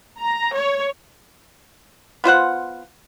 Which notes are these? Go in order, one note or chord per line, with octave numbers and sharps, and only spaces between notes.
A#5
C#5
B3 F4 C5 F#5